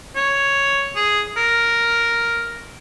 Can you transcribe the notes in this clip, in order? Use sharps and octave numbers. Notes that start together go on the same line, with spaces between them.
C#5
G#4
A#4